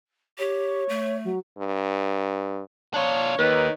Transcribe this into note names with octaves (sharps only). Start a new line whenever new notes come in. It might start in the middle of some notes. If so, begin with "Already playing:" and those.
G4 C#5
A3
F#3
G2
D4 F4 C#5
D#2 D#3 B4